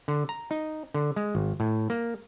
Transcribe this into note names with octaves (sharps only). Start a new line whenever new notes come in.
D3
A#5
D#4
D3
G#3
G#1
A2
A#3